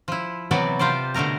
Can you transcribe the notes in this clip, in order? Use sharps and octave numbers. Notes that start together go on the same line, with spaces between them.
F3 E4
C3 E3 F#3 B3 F#4 D5
C3 F4 G4 C5 D5
B2 D3 A3 A#4 A#5